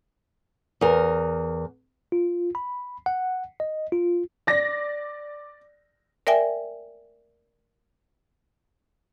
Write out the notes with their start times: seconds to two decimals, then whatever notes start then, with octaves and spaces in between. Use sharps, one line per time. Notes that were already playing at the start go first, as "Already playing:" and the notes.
0.81 E2 A#4
2.12 F4
2.55 B5
3.06 F#5
3.60 D#5
3.92 F4
4.47 D5 A#6
6.27 A#4 D5 E5 G5 G#5